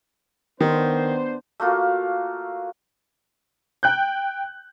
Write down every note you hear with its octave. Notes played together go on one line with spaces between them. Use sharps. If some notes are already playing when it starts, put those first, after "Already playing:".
D#3 B3 D4 C5
A3 A#3 F4 F#4
G5 F#6 G6